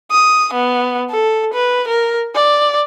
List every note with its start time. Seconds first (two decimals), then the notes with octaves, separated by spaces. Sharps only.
0.12 D#6
0.54 B3
1.10 A4
1.53 B4
1.88 A#4
2.35 D5